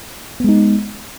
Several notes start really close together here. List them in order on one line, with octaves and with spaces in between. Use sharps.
B3 G#3 D#4